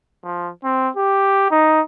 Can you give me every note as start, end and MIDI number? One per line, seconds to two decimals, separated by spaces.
0.24 0.50 53
0.64 0.89 60
0.97 1.48 67
1.51 1.81 63